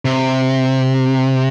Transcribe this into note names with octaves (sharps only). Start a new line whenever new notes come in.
C3